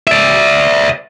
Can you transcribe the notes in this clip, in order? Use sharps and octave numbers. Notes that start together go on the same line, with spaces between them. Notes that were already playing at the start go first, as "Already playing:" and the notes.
D5 E5